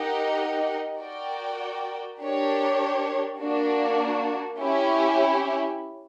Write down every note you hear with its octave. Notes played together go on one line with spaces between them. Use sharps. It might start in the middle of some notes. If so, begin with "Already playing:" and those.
Already playing: D#4 G4 A#4 D#5 F#5
F#4 A#4 D5 G5
D4 G4 A#4 C#5
A#3 D4 F#4
C#4 E4 G4